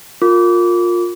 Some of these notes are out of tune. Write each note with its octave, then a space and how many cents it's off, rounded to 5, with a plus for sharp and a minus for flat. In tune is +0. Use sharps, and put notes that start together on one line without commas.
F4 +20 A#4 -15 D6 -25